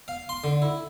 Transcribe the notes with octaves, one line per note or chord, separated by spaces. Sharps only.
F5
C6
D3
E4